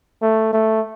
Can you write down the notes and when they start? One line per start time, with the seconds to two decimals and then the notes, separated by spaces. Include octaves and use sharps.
0.22 A3
0.53 A3